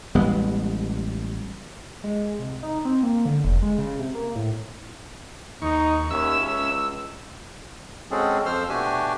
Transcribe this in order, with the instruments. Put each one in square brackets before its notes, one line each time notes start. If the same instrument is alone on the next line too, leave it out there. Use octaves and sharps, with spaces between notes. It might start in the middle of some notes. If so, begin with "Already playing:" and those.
[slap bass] A1 G3 G#3 B3
[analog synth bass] G#3
C2
D#4
C4
A#3
D3
F1
G#3
C#3
C3
A#3
A2
[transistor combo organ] D#2 C#6 [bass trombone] D#4
[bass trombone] D#2 [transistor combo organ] C#4 E5 [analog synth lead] E6
[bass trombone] C#2
[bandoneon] G#3 C4 C#4 F#4 G#4 A4
F2 F3 C5 C6 E6 F6
B2 A3 D4 F#4 G4 G#5